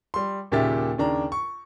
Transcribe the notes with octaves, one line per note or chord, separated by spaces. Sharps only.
G3 C6
D#2 A#2 C#3 G4 E5 A6
D#2 C#3 D4 A#5
C#6